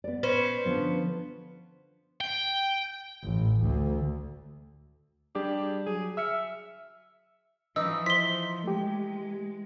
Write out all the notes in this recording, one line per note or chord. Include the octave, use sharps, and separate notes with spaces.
B3 D5
C#4 B4 C5
D3 F3 B3
G5
A1
D2
G3 D4 G4 G#4
F#3 G#4
E5 E6 F6 C#7
E3 F3 D#4 D#5 E6
E4 C5 C6 B6 G7
G#3 A3 G4